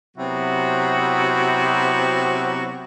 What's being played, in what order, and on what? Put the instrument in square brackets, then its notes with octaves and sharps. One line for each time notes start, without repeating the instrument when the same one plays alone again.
[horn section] C3 F#3 B3 C4 E4 F#4